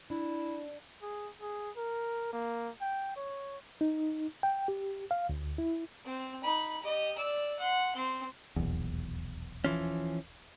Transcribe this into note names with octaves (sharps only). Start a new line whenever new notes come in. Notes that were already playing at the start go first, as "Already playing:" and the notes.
D4 E4
G#4
G#4
A#4
A#3
G5
C#5
D#4
G5
G4
F5
D2
E4
C4
D#4 B5
G4 D#5
D5 E6
F#5 C6
C4 C6
D#1 B1 E2
E3 F3 C#4